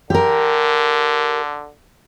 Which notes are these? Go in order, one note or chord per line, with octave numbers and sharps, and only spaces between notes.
D3 G4 A#4